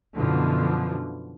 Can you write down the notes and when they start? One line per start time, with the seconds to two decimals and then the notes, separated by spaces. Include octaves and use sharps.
0.15 F#2 B2 D3 E3 F3